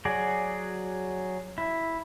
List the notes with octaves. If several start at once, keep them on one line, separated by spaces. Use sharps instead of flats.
F#3 F#4 G#4 D5
E4